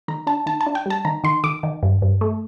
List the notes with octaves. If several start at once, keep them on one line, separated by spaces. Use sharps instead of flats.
D#3 A#5
D4 A5
D#3 A5
A5
D4
G5
G3 A5
D#3 A#5
D#3 C6
D#3 D6
D#3
G2
G2
A3